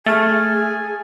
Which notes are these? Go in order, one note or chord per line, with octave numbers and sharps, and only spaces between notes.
A3 G#4 G#5 F6 A6